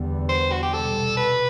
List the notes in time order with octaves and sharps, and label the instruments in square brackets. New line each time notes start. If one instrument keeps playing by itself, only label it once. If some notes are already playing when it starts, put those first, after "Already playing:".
Already playing: [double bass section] E2 D3 G3 B3
[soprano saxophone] C5
F#4
G4
[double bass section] C2 B2 G3 [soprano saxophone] A4
[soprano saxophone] B4